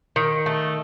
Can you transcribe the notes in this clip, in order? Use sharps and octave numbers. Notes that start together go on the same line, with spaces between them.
D#3
A3